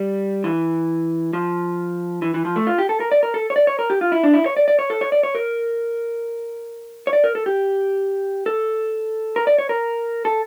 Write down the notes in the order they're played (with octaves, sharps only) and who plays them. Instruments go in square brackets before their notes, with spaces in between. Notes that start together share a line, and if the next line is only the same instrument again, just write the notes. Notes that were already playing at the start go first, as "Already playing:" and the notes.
Already playing: [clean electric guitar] G3
E3
F3
E3
E3
F3
A3
F4
G4
A4
A#4
D5
A#4
A4
C#5
D5
C#5
A#4
G4
F4
E4
D4
E4
C#5
D5
D5
C#5
A4
C#5
D5
C#5
A#4
C#5
D5
A#4
A4
G4
A4
A#4
D5
C#5
A#4
A4